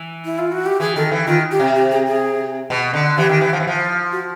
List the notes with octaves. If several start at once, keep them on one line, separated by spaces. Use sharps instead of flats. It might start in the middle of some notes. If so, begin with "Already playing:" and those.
Already playing: E3
E4
F4
F#4
G4
E3 G#4
D#3 A4
E3
D#3 F4
G4
C3
G4
G#4
G#4
B2
D3
E3 G4
D#3
E3
F3
E3
F3
F#4